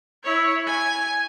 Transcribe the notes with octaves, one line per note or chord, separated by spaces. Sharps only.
E4 C#5
G#5